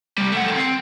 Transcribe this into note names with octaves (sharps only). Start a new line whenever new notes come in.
C3 G3
A3 F#5
D#3 A4
C4